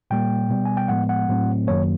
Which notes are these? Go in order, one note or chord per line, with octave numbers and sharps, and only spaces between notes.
A#2 G3 A#3 G5
B2 G3 B3
G#5
G5
A2 F3 G#3 B3 F#5
F#5
A2 F#3 A3 C4
F#2 D#3 F#3 A#3 C#5